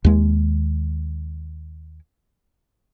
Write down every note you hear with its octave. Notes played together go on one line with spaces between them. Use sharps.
D#2 G#3